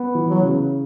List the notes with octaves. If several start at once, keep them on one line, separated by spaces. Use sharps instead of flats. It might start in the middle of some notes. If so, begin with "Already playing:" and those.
Already playing: B3
E3
F#3
C#3